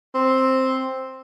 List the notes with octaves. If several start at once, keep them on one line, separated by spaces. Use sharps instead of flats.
C4